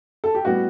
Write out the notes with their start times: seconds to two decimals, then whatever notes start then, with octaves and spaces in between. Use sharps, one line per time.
0.24 A4
0.35 G4
0.45 A2 G3 B3 F#4